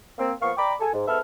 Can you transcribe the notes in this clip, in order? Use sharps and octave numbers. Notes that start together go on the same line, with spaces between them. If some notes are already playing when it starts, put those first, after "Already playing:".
A#3 C4
F3 A#3 B3 F5 C#6
D5 G5 A#5 B5 D6
A4 G#5
G#2
G#2 B3 A4 B4 E5 F6